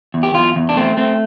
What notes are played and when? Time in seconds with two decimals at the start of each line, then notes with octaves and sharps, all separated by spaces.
0.14 E2
0.23 G4
0.34 E2 F4
0.56 E2
0.69 D4
0.77 A3 C4
0.97 A3 C4